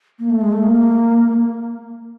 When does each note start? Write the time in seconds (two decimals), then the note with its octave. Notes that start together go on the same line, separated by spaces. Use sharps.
0.19 A#3
0.30 A3
0.41 G#3
0.52 A3
0.63 A#3